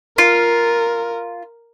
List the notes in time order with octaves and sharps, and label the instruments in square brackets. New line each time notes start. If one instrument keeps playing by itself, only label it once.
[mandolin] F4 [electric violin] A#4